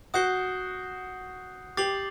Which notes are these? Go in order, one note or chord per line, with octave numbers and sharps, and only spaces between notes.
F#4 D#6 G6 C7 G7
G4 D6 A6 C7 F#7